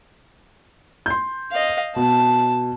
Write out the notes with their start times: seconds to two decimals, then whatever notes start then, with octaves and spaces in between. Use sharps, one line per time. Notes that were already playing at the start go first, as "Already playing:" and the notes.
1.06 C6 G6
1.52 D#5 F5
1.96 B2 A5